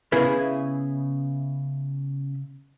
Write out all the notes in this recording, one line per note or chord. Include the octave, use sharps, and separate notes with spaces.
C#3 B3 E4 G#4 B4